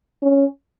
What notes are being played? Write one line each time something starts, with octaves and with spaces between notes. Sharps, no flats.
C#4